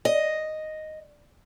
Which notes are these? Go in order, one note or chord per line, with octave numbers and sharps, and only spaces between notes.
D#5